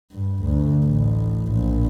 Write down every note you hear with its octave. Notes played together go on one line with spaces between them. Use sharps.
G2
D2
A1
A#1